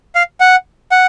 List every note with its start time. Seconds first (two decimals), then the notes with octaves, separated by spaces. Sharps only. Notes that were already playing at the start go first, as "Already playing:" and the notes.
0.15 F5
0.40 F#5
0.91 F#5